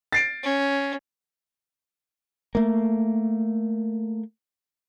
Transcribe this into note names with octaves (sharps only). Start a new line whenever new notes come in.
A6 C7 D7
C#4
A3 A#3